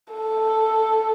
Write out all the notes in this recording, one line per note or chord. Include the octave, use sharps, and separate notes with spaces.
A4